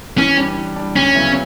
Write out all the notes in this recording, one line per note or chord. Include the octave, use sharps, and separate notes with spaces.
E3 C#4
G3 D4
E3
G3 D4
D2 C#4
C#3 F#3 B3 E4